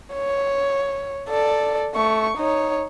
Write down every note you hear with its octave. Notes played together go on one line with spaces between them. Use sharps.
C#5
A4 D5
A3 C#6
D#4 C#5